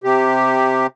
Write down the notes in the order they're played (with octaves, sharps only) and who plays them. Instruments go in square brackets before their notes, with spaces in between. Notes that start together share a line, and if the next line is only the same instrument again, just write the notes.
[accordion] C3 G4